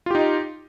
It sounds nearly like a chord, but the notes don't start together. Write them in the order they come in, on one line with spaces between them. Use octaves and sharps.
F4 G4 D#4